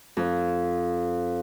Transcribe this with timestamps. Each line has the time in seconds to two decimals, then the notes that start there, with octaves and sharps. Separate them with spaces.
0.17 F2